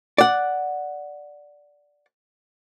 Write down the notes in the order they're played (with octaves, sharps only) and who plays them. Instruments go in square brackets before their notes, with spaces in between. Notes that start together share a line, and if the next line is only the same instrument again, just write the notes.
[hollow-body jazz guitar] D5 F#5